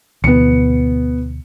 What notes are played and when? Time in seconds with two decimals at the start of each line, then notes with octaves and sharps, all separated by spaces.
0.24 D2 B2 E3 B3 C#7